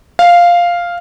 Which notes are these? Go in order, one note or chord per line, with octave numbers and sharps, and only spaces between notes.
F5